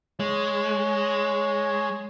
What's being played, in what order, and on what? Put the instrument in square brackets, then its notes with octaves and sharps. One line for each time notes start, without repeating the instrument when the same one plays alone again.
[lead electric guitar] G#3 [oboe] C#5